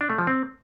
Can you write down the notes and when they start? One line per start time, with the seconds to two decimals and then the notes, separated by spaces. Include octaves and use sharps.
0.01 D4
0.10 A3
0.18 F3
0.27 C4